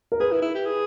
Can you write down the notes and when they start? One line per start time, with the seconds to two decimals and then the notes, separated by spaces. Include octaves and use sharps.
0.12 A#4
0.20 G#4 B4
0.32 E4
0.42 E4
0.55 G4
0.66 G#4